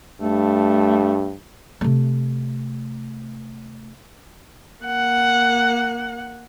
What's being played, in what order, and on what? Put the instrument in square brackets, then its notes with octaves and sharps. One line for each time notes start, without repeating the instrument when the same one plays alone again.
[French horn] G2 [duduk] A3
[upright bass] C3 A3
[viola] A#3 F#5